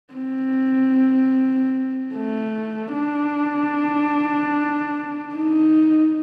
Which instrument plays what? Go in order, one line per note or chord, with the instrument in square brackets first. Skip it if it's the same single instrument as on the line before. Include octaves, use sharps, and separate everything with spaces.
[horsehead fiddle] C4
A3
D4
D#4